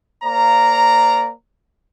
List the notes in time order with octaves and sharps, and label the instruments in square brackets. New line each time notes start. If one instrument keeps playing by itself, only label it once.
[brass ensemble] A#3 C5 D5 F5 A#5